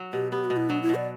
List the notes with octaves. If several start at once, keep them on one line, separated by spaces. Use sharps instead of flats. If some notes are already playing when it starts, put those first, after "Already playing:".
Already playing: F#3
B2 G4
B3 G4
F#4
B2
E4
F#3 D4
E4
B2
D5